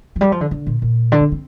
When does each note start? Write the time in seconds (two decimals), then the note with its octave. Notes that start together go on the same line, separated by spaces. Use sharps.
0.16 F3
0.21 G3
0.32 F3
0.41 D3
0.51 D3
0.66 A#2
0.82 A#2
1.12 D3
1.21 C4
1.32 C4